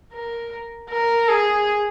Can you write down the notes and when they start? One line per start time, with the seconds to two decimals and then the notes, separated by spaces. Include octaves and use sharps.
0.13 A#4
0.90 A#4
1.28 G#4